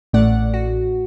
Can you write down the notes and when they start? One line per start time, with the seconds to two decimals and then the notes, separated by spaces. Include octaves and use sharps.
0.13 A1 A2 A3 D5 F#5
0.54 F#4